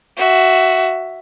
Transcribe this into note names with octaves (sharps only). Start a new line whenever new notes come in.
F#4 E5